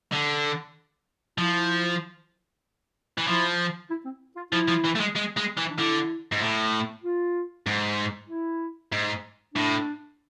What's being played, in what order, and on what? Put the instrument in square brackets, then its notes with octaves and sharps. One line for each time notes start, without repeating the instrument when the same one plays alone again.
[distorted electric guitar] D3
[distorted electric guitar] F3 [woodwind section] E4
[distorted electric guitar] E3
[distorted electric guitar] F3 [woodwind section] E4
[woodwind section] E4
C4
F4
[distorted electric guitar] F3 [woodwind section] E4
[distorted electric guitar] F3
E3
A3
G#3
G#3
G#3
E3
[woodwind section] D4
[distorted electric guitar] D3 [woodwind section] E4
[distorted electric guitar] G#2
A2
[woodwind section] F4
[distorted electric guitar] G#2
[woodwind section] E4
[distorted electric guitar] G#2
[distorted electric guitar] A2 [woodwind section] D4